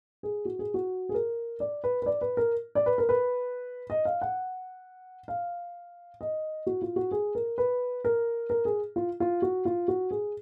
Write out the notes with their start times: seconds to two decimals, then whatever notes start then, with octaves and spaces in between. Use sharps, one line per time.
0.23 G#4
0.45 F#4
0.59 G#4
0.74 F#4
1.09 G#4
1.14 A#4
1.60 D5
1.84 B4
2.02 B4
2.06 D5
2.21 B4
2.37 A#4
2.75 D5
2.86 B4
2.98 A#4
3.09 B4
3.90 D#5
4.05 F5
4.22 F#5
5.28 F5
6.21 D#5
6.67 F#4
6.82 F4
6.96 F#4
7.11 G#4
7.35 A#4
7.58 B4
8.05 A#4
8.50 A#4
8.65 G#4
8.96 F4
9.20 F4
9.42 F#4
9.65 F4
9.88 F#4
10.11 G#4